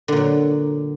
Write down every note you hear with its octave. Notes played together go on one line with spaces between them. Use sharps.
A#2 D3 F#3